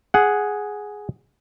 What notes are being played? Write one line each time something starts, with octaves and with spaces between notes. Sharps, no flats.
G#4 F#5